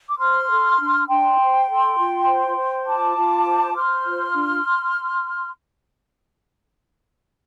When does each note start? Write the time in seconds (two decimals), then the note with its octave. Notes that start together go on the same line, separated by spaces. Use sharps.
0.09 D6
0.19 C5 C6 F6
0.49 A4
0.78 D4
1.08 D4 G5 C6
1.39 C5
1.68 A4
1.97 F4
2.26 C5
2.56 C5
2.86 F4 A5 D6
3.16 F4
3.46 C5
3.75 C5 C6 F6
4.05 F4
4.34 D4